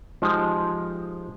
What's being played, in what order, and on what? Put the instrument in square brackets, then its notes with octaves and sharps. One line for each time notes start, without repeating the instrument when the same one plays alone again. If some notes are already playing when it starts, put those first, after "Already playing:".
[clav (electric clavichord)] F3 G#3 D#4 G4 C5